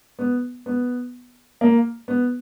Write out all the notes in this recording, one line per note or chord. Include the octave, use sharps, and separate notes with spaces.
B3
B3
A#3
B3